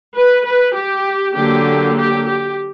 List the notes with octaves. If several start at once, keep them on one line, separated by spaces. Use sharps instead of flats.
B4
B4
G4
D3 F#3 A#3 G4
G4
G4